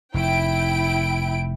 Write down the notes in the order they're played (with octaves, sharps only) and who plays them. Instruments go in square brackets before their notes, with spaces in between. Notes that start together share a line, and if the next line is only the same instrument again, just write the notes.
[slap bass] F1 [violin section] E4 G5 D7